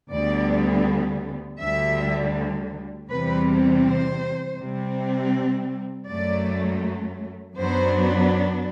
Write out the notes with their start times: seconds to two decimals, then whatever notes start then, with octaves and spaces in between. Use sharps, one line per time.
0.11 D2 D3 G3 B3 D5
1.61 D2 D3 G3 E5
3.10 E2 C3 E3 G3 C4 B4
3.84 C5
4.59 C3 G3 C4
6.08 F#2 F#3 A3 D5
7.57 F#2 F#3 B3 D4 C5